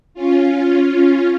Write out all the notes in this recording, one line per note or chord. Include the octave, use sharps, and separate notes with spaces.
C#4 F4